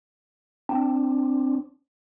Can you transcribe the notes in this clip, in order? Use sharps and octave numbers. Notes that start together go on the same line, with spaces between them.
C4 D4